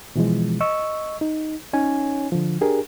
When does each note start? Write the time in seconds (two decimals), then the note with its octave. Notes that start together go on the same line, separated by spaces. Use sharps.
0.16 B2 E3 F3 G#3
0.61 D#5 C#6 E6
1.21 D#4
1.73 C#4 D#4 C#5 G#5
2.32 D3 F3
2.61 D4 G4 G#4 A#4